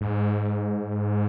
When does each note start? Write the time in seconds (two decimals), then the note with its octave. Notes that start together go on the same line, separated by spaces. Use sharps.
0.01 G#2